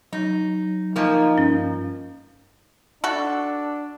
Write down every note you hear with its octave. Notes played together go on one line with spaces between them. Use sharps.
F#3 D#4
F3 A#3 D#4 A#4 D#5 G#5
G2 C#4
D4 F#4 A4